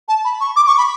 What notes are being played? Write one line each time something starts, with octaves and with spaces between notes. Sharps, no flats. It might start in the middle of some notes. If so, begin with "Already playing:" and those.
A5
B5
C#6
D6
C#6
B5